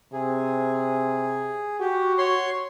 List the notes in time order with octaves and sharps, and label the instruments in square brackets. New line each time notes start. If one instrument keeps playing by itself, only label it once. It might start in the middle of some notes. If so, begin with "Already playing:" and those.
[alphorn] C3 [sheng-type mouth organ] G#4
[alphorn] F#4 [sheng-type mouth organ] G4
[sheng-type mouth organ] C#5 C6